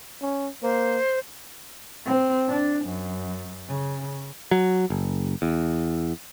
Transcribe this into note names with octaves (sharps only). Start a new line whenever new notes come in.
C#4
A#3 C5
C4
D4
F#2
C#3
F#3
F#1
E2